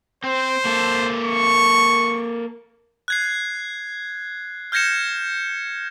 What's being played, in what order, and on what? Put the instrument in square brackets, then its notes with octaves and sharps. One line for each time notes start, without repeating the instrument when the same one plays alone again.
[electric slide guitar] C4 [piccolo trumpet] C5
[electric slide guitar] A#3 A4
[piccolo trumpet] C#6
[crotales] F#6 G#6 C7
F6 G6 G#6 A#6 C#7 E7